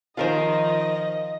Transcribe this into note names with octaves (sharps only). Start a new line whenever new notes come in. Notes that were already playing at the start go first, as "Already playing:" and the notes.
D#3 F3 F4 A#4 C5 D#5